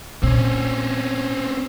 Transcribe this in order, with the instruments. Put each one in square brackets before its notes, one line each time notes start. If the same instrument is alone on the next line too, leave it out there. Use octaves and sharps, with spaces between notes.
[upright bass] A#2 [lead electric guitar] C4 C#4